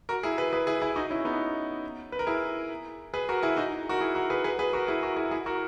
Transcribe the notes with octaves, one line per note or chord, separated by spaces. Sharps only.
F#4 A#4
E4 G#4
G#4 B4
G#4 B4
E4 G#4
E4 G#4
D#4 F#4
C#4 E4
B3 D#4
B4
A#4
E4 G#4
G#4 B4
F#4 A#4
E4 G#4
D#4 F#4
F#4 A#4
E4 G#4
F#4 A#4
G#4 B4
G#4 B4
G#4 B4
F#4 A#4
E4 G#4
F#4 A#4
E4 G#4
E4 G#4
F#4 A#4